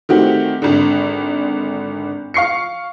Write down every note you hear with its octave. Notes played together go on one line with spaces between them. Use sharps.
D#3 A3 C4 F#4 G4
G#1 D3
F5 C#6 C7 C#7